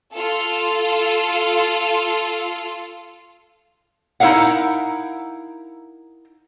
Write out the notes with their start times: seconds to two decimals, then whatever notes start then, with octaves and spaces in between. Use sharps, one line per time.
0.13 F4 A4
4.20 D#4 E4 A4 A#4 F5 F#5